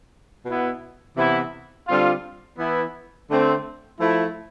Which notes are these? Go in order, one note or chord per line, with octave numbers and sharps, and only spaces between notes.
B2 B3 E4
C3 E3 B3 E4
D3 G3 C4 F4
E3 B3 E4
D3 A3 C4
F3 A3 E4